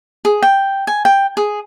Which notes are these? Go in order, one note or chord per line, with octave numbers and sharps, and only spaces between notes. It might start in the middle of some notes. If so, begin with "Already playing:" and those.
G#4
G5
G#5
G5
G#4